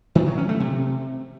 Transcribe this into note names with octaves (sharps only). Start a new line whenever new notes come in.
D#3
F#3
C#4
A3
C3